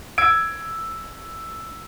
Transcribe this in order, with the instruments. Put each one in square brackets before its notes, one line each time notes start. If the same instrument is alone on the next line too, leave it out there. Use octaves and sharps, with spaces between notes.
[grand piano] E6 G#6 D7